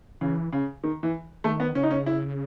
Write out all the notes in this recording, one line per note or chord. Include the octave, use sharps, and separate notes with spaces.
C#3 E3
C#3
D#3
E3
D#3 A3
B3
C#3 C#4
D#4
C#4
E4